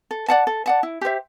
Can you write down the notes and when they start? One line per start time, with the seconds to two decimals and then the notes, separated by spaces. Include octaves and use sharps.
0.11 A4
0.28 D5 F#5 A5
0.47 A4
0.66 D5 F#5 A5
0.83 E4
1.01 G4 C5 E5